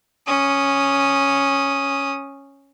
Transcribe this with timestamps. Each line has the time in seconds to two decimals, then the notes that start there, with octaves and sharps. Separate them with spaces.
0.27 C#4 D#6